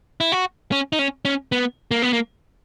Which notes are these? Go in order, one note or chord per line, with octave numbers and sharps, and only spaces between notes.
E4
F#4
C#4
D#4
C#4
C#4
B3
A#3
B3
A#3